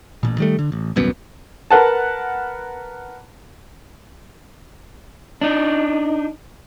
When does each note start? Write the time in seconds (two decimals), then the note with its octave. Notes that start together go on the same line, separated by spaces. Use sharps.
0.23 A1 A#2
0.38 D#3 G3 A3
0.59 D3
0.72 A1
0.96 D#1 C2 F#2 B3
1.71 A#4 B4 F#5 A5
5.41 D4 D#4